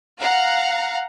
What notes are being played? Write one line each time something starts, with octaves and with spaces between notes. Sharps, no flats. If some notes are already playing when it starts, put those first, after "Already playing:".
F5 F#5 A#5